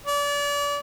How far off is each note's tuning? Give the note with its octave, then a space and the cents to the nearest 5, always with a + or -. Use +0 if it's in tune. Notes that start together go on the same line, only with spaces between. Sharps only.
D5 -35